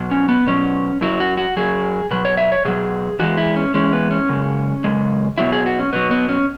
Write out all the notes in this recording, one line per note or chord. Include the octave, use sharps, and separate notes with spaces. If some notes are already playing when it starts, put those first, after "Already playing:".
Already playing: B2 F#3
C#4
B3
B2 F#3 C#4
F#2 F#3 E4
F#4
F#4
F#2 F#3 G#4
B2 F#3 B4
C#5
E5
C#5
B2 F#3 G#4
E2 E3 G#3 F#4
E4
C#4
E2 E3 G#3 C#4
B3
C#4
F#2 C#3 G#3
F#2 C#3 G#3
B2 F#3 E4
G#4
F#4
C#4
B2 F#3 B3
B3
C#4